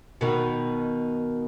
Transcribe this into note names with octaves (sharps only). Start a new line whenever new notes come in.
B2 D#3